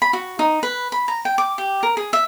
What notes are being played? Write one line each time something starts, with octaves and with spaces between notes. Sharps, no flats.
B5
F#4
D#4
B4
B5
A#5
G5
D6
G4
A#4
G#4
E5